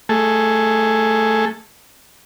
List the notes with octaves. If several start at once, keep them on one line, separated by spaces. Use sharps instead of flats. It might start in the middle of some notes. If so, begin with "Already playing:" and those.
A3 G#4 A4